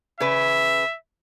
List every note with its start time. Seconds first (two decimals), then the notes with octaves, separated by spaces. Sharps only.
0.20 C#3 B4 E5